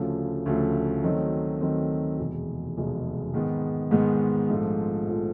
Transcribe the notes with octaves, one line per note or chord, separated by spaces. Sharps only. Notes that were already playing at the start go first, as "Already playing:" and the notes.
Already playing: D2 C#3 F3 A3
D2 C#3 F3 A3
D#3 F#3 A3 C4 D#4
D#3 F#3 A3 C4 D#4
F1 E2 B2 G#3
F1 E2 B2 G#3
G#2 D#3 G#3 B3
G#2 D#3 G#3 B3
A#1 G#2 F3 A3
A#1 F3 A3